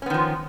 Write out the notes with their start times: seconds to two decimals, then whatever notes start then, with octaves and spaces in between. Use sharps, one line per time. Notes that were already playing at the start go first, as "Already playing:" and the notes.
0.02 C#4
0.06 B3
0.10 D#3
0.14 F3